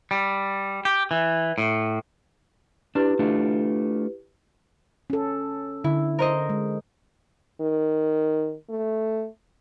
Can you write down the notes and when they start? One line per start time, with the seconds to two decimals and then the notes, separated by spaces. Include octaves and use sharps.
0.11 G3
0.85 G4
1.11 E3
1.58 A2
2.95 D4 E4 G4 B4
3.19 A3 D4 F4
5.10 C#4 A4
5.84 D3 E4
6.19 A#4 C5 D#5
6.50 G#3
7.61 D#3
8.70 A3